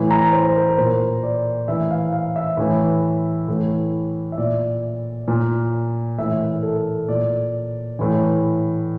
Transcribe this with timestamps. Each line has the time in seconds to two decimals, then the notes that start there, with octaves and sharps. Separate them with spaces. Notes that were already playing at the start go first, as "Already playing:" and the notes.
Already playing: A2 E3
0.11 A#5
0.33 C5
0.50 C5
0.55 A#4
0.69 A#4
0.78 A#2 C5
1.23 D5
1.68 A2 E3 E5
1.91 F5
2.13 F5
2.36 E5
2.57 A2 E3
3.48 A2 E3
4.32 E5
4.38 A#2 D5
5.28 A#2
6.18 A2 E3 E5
6.41 A#4
6.63 A4
7.09 A#2 D5
7.99 A2 E3